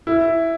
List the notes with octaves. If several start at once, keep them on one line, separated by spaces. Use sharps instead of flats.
E4